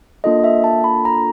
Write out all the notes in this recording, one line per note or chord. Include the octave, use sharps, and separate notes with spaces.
A#3 D4 F4 A4 D#5
E5
A5
B5
A#5